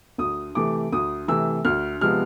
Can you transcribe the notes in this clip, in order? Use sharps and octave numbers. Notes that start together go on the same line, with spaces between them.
D2 D#6
C3 E3 A3 D6
D2 D#6
C3 E3 A3 E6
D2 F6
C3 F3 G#3 B3 F6